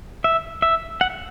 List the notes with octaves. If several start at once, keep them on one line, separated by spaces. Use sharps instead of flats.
E5
E5
F#5